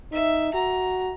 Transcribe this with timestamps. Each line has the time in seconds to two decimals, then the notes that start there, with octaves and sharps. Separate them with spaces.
0.12 D#4 E5
0.54 F#4 A#5